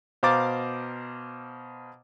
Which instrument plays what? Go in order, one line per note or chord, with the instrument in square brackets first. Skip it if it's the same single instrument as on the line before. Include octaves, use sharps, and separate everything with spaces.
[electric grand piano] B2 C5 F5 A#5 D6 A6